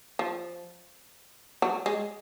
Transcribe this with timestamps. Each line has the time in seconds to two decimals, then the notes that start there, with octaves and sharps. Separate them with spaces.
0.19 F3
1.62 F#3
1.86 G#3